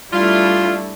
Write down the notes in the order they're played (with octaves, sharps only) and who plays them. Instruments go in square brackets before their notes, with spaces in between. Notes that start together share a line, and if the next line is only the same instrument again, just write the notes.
[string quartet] G3 A3 [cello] D4 E4 [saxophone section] F4